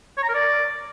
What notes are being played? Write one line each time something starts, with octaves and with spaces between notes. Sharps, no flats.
C#5
A#5
A#4
D5